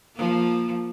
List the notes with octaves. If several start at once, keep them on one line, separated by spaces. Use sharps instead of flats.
F3 A#3